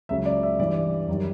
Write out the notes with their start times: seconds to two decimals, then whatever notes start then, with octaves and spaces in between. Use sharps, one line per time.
0.09 C#2 C#3 F#3 E5
0.26 D5
0.43 E5
0.59 G2 E3 G3 D5
1.08 F#2 D#3 G3